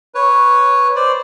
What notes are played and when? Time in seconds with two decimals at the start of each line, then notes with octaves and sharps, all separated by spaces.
0.14 B4 C#5
0.96 C5 D5